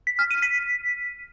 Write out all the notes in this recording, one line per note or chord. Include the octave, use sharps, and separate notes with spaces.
B6
F6
D#7
B6